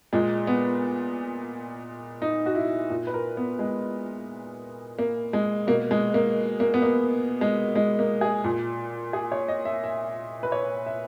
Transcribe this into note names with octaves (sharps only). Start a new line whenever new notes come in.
A#2 G#3
B3
D#4
F#4
E4
A#2
B4
A#4
B3
G#3
A#3
G#3
B2 A#3
G#3
A#3
A#3
B3
A#3
G#3
G#3
A#3
G#4
A#2
G#4
C#5
D#5
E5
E5
B4
C#5
E5